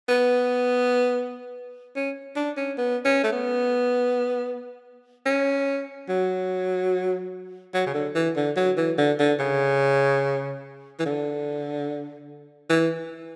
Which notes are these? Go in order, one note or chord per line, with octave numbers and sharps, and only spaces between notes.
B3
C#4
D4
C#4
B3
C#4
A3
B3
C#4
F#3
F#3
C#3
D3
E3
D3
F#3
E3
D3
D3
C#3
E3
D3
E3